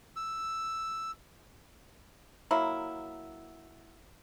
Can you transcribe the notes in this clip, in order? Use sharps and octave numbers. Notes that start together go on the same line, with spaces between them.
E6
F#3 A#3 E4